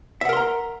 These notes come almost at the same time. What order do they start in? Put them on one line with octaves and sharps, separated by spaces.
E5 F#5 A#4 C6 A#5